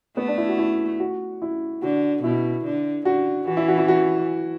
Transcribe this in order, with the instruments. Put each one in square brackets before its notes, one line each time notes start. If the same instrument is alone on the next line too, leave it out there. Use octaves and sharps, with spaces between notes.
[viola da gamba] A3 [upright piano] B3
[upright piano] D4
E4
F#4
E4
F#4
E4
[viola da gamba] D3 [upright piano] F#4
[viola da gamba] B2 [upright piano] E4
[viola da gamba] D3
[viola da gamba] D3 [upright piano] F#4
[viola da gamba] E3 [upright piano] F#4
[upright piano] E4
F#4
E4
F#4